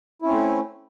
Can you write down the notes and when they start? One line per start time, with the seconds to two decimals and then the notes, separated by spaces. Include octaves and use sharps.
0.22 E4
0.25 C#4
0.28 C4
0.32 A3